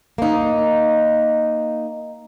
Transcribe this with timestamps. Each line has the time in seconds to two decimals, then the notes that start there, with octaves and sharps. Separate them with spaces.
0.18 A#3 D#4